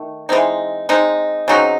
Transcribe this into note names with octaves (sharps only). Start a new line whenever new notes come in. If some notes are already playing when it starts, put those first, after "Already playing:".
Already playing: D#3 A3
E3 G#3 C4 D#4
G#3 C4 D#4
C#3 F#3 C4 D#4